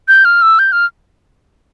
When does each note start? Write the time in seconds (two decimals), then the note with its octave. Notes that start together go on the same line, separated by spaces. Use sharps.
0.08 G6
0.25 F6
0.42 E6
0.59 G6
0.72 F6